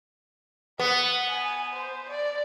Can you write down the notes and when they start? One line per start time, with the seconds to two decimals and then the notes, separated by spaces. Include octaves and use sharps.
0.79 B3 F#5
1.30 G#5
1.73 C5
2.10 D5